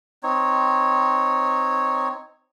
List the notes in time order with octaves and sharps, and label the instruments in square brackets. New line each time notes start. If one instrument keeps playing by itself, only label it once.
[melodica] C4 D#4 C#5